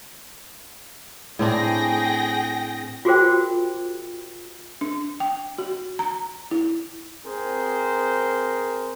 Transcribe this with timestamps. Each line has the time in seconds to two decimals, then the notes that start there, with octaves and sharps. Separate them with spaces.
1.39 A2 C4 D4 G#4 G5 A#6
3.05 F4 F#4 G#4 A#4 C5 G5
4.81 D4
5.20 G5
5.58 F#4
5.99 A#5
6.51 E4
7.26 C4 G#4 A#4 C5